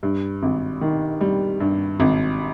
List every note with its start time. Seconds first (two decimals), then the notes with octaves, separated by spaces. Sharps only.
0.03 G2
0.43 G#1
0.81 D#3
1.21 G3
1.60 G2
2.00 G#1